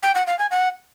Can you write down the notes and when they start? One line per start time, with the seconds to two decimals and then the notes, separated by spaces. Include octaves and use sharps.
0.03 G5
0.15 F#5
0.27 F5
0.39 G#5
0.51 F#5